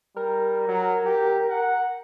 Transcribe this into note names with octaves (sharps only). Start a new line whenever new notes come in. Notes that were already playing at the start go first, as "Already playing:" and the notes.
G3 A#4
F#3
G4
F#5